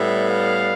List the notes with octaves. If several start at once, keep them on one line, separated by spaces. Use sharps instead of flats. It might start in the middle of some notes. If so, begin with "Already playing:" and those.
Already playing: A2 G3 B3 E5
F5